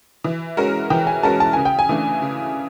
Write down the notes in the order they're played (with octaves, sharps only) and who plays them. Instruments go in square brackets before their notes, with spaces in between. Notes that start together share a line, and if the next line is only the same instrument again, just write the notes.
[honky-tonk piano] E3
G#3 C#4 F#4 A#4
[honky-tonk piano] E3 [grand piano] G5
[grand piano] G#5
[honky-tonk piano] G#3 C#4 F#4 A#4 [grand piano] A5
[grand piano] A5
[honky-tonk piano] C#3 [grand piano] G#5
[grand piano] G5
G#5
[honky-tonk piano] E3 A3 D4
C#3